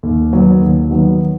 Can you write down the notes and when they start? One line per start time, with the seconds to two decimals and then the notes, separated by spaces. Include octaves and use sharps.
0.03 D#2
0.33 D#3 F#3 B3
0.61 D#2
0.90 D#3 F#3 B3